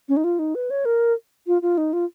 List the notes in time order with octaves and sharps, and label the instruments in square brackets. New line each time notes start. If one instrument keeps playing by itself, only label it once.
[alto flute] C#4
D#4
F4
D#4
B4
C#5
A#4
F4
F4
D#4
F4